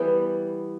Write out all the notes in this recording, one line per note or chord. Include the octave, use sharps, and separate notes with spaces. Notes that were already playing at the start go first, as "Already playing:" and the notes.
Already playing: E3 G3 B3 G5